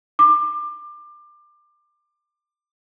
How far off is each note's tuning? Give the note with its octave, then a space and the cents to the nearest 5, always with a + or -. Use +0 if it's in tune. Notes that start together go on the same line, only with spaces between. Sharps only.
D6 +25